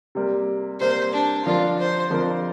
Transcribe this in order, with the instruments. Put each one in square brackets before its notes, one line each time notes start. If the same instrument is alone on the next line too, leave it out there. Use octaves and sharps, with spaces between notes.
[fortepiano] C3 G3 A#3
[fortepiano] C3 G3 A#3 [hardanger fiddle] C5
[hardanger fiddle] D4
[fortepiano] F2 D3 F3 D4 A#4 [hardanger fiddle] F4
[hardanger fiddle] C5
[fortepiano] F2 D3 F3 D4 A#4